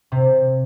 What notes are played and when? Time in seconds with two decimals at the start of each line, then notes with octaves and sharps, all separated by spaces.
0.12 C3